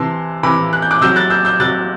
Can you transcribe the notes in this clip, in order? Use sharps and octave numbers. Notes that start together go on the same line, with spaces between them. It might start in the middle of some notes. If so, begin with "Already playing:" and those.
Already playing: C3 E3 A5 C6
C3 E3 B5 D6
F#6
G6
D6 F#6
C3 F#3 E6 G6
F#6 A6
E6 G6
E6 G6
C3 F#3 F#6 A6